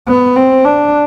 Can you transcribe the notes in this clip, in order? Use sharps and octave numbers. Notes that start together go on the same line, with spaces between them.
B3
C4
D4